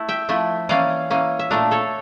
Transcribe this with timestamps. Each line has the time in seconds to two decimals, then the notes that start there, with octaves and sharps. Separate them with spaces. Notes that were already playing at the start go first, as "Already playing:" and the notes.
Already playing: A3 E4
0.08 E5 G5
0.29 F3 A3 E4
0.69 E3 A#3 C#4 D5 F5
1.10 E3 A#3 C#4
1.39 E5
1.51 A#2 A3 D4 A#4 D5
1.71 A4 C#5